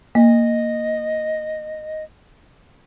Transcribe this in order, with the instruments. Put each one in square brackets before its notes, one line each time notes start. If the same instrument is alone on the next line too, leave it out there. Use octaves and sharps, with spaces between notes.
[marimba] A#3 [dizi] D#5